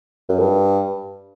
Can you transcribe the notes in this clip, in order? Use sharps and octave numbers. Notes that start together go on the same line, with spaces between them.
F#2
G2